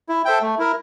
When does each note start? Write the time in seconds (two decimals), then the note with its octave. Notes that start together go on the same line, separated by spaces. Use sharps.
0.09 E4
0.25 A4 C5 E5 G5
0.42 A3
0.59 E4 A#4